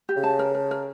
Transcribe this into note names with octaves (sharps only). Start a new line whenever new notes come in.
G4
C#3
A5
A#4
A#4
A#4